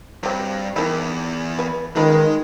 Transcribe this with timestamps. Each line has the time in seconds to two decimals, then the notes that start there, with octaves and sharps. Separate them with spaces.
0.23 G2 F#3 C4
0.76 E2 D#3 E4
1.59 B4 G#5
1.96 D#3 G#3 C#4 F4 B4